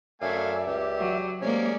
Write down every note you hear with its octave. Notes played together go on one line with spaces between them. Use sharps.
F#2 A3 D5 E5 F5 G#5
C#2 G4
F#3
C3 G#3 A#3 C#4 D5